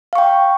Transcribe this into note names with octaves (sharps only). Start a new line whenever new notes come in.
F5 G5 C#6